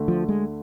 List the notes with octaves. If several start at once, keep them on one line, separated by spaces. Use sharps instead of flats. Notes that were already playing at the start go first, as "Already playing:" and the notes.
Already playing: D2 D3 A3
F3
G#3